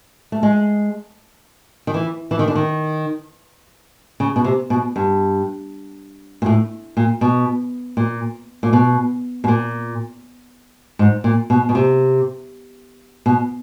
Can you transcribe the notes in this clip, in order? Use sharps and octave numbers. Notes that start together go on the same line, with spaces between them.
A3
G#3
D#3
E3
E3
D#3
D3
D#3
C#3
B2
C3
B2
G2
A#2
A2
A#2
B2
A#2
A#2
B2
B2
A#2
G#2
A#2
B2
B2
C3
B2